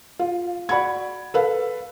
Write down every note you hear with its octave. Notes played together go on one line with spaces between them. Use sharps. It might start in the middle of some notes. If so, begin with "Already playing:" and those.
F4
F#4 D5 F#5 B5 G#6
A4 B4 F5